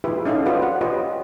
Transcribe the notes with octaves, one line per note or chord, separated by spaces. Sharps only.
E4 F4 G4 G#4 B4 E5
C#4 D#4 G#4 A4 F5
F4 F#4 B4 D5
C5 F#5
F4 G4 B4 C#5 D#5